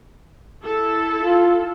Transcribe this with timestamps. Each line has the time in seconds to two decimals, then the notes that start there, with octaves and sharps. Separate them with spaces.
0.64 E4 A4
1.19 F4